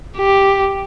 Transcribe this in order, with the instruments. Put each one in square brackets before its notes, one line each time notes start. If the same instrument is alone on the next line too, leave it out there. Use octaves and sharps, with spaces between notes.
[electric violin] G4